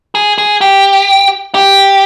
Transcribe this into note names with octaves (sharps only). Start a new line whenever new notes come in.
G#4
G#4
G4
G4